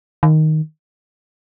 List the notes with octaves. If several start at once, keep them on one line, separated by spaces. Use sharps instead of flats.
D#3